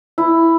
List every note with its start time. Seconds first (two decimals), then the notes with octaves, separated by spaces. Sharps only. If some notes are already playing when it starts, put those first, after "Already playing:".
0.18 E4